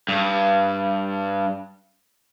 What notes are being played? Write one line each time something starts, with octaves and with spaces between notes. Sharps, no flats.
G2